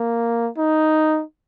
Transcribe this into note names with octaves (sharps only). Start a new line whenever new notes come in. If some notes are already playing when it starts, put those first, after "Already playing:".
Already playing: A#3
D#4